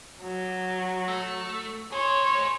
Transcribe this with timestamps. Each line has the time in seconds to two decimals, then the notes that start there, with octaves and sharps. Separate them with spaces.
0.22 F#3
1.08 A3
1.92 G#4 C5 C#5